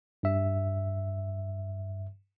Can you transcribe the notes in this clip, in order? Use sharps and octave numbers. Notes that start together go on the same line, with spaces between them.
G2 E5